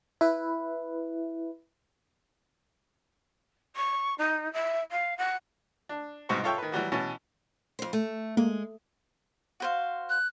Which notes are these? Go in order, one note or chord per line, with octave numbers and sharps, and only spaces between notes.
E4 B4
C#6
D#4
E5
F5
F#5
D4
C2 G#2 B2 C5 C#6
F4 A4 C#5 E5 G5
D#3 B4
E3 F#3 G3 F#4
B2 E3 C#4 A5
F2 C5
A3
G#3 A#3
F#4 C5 F5
F#6